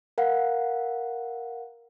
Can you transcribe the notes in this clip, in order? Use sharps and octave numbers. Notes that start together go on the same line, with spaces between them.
A#4 F5 F#5